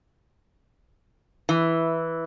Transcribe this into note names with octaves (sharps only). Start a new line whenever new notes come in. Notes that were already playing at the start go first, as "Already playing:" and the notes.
E3